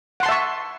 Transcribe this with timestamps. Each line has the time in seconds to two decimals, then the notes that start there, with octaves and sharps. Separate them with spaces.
0.20 F#5
0.23 C6
0.26 A5
0.29 E5
0.32 C#6